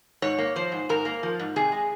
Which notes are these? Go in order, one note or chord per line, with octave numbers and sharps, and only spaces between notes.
G#2 C#5
A#3
F3 C5
G#2
G#2 A#4
A#3
F3
G#2
C3 G#4
G#3